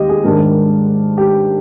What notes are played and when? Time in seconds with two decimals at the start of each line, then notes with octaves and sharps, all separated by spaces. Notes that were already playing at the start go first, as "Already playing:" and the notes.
Already playing: D#2 G#3 G4 D#5
0.09 G#4
0.24 G#2 D#3 G#3 D4 A#4
0.40 A#4
1.17 G4